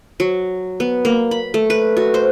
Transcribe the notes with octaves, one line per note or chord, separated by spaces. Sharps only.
F#3
B3
A#3
B5
A3
B4
F#4
C5